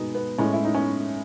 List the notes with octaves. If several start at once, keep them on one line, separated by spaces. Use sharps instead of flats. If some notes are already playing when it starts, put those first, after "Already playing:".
Already playing: B2 G#3 B3 D#4
B3
A2 G#3 C#4
E4
D#4
C#4